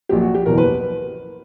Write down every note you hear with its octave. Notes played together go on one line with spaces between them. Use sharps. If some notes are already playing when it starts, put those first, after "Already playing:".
A#1 A#2 F#3 G4
F#4
G4
F#1 E2 B2 A#4
B4